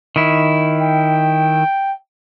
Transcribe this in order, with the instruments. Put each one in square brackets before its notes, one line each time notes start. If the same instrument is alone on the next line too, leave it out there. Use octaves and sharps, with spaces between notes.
[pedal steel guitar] D#3 E4
[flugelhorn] G5